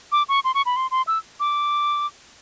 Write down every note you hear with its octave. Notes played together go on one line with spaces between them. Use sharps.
D6
C#6
C6
C#6
B5
C6
C6
E6
D6